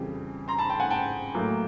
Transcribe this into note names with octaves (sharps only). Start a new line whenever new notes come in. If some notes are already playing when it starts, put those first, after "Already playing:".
Already playing: F2 C#3 E3 G3
A#5 C6
A5 B5
G5 A5
F#5 G#5
G5 A5
A2 F#3 A#3